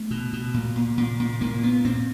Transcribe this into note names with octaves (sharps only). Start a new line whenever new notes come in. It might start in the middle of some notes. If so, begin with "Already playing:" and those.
Already playing: A3
B2
B2
A#2
A#2
A#2
A#2
A#2 A#3
A#2 B3
A#2 C4